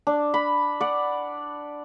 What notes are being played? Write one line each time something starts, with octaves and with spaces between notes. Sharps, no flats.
D4
B5
D5 F#5